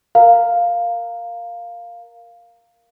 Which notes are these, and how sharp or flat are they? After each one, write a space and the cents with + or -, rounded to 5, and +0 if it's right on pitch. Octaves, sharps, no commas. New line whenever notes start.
A#4 +0 F5 +0 A#5 -20